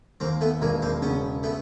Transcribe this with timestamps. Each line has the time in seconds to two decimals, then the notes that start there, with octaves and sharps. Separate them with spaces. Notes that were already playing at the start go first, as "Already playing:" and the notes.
0.20 D#2 A#3 C4
0.41 A3 B3
0.61 E1 G#3 A#3
0.82 A#3 C4
1.02 C#3 B3 C#4
1.43 A3 B3